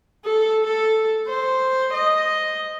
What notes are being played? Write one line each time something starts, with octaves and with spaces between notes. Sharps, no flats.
A4
A4
C5
D#5